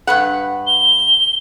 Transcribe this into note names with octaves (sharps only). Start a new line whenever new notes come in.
G2 B4 F#5
G7